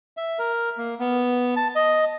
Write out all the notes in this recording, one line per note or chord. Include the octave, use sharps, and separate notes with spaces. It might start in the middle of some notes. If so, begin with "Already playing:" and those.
E5
A#4
A#3
B3
A5
D#5